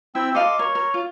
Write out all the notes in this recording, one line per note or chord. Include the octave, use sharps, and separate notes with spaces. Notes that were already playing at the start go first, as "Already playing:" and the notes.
C4 E4 G5 E6
A4 D#5 F5 C6 D6
A#4 C#5
A#4
F4